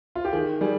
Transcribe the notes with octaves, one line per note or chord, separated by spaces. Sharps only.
F4
G4
D#3 G#4
G3 G#4